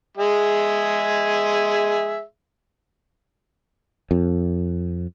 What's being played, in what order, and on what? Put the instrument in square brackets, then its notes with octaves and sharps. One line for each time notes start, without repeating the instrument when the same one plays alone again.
[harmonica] G#3 G#4 E5
[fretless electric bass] F2